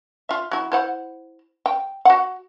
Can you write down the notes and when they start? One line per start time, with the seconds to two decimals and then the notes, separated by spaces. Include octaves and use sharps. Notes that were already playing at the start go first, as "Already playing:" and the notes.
0.29 F4 E5
0.51 F#3 E4
0.72 E4 C5 F#5
1.66 G5
2.05 F#4 F#5